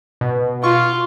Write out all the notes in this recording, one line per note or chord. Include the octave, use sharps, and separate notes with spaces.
B2
F4 C#6